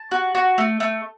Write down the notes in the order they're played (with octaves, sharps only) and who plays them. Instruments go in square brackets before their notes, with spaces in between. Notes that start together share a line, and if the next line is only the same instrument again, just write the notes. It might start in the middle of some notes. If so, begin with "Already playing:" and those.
Already playing: [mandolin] A5
F#4
F#4
A3
A3